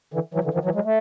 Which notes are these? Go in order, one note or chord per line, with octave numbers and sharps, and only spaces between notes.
D3 E3
E3 F#3
D3 E3
D#3 F3
E3 F#3
F#3 G#3
A3